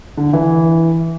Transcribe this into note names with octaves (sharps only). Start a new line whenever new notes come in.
D3
E3